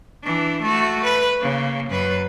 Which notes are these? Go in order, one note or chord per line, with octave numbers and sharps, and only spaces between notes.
E3 D4
A3 F#4
B4
C#3 A#3
F#2 B4